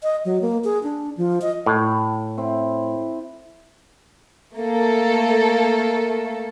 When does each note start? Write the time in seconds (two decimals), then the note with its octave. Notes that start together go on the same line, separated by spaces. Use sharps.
0.03 D#5
0.25 F#3
0.42 A#3
0.64 G#4
0.83 D4
1.17 F3
1.42 D#5
1.66 A2
2.38 C4 E4
4.55 A3 A#3 A4